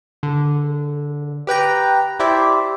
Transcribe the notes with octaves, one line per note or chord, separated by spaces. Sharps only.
D3
G4 B4 G5 A#5
E4 G4 C5 D5 E5